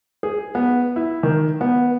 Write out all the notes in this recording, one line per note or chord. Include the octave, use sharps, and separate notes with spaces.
G#4
B3
E4
D#3
B3